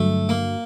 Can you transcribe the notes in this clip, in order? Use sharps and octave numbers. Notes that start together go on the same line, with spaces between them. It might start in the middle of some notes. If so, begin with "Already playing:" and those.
Already playing: G2 D3 F#3 A3
A#3